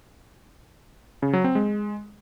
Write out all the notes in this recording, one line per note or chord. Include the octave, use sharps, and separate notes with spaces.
C#3
F#3
C4
G#3